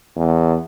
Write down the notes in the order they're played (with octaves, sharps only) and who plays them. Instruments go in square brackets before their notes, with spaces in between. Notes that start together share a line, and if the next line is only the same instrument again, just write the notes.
[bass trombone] E2